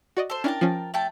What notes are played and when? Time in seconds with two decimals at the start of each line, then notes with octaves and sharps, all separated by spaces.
0.17 F#4 D5 D#5
0.30 A4 C5
0.44 C#4 D4 E4 A#4 G5 A5
0.61 F3 C#4
0.94 A3 G5 A5